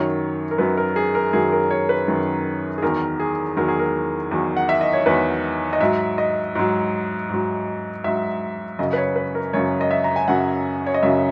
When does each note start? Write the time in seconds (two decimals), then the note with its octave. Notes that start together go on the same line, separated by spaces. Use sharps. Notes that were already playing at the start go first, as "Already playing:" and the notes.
Already playing: F#2 D#3 F#3 C#5
0.51 A#4
0.58 F#2 D#3 F#3 B4
0.77 A#4
0.96 G#4
1.15 A#4
1.33 F#2 D#3 F#3 G#4
1.52 A#4
1.71 C#5
1.89 B4
2.08 F#2 D#3 F#3
2.78 G#4
2.82 E2 D#3 F#3 A#4
3.20 G#4
3.57 E2 D#3 F#3 A#4
3.68 G#4
3.79 A#4
4.31 E2 D#3 F#3
4.57 F#5
4.69 E5
4.81 D#5
4.93 C#5
5.06 E2 D#3 F#3 B4
5.73 D#5
5.80 G#2 F#3 E5
6.18 D#5
6.55 G#2 F#3
7.30 G#2 F#3
8.04 G#2 F#3 E5
8.79 F#2 C#3 F#3 D#5
8.93 B4
8.97 C#5
9.16 B4
9.35 A#4
9.53 F#2 C#3 F#3 C#5
9.81 D#5
9.91 E5
10.04 A#5
10.16 G#5
10.28 F#2 C#3 F#3 F#5
10.87 C#5
10.94 D#5
11.03 F#2 C#3 F#3 E5